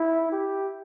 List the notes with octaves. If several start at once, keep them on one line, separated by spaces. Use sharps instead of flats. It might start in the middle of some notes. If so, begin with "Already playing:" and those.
Already playing: E4
G4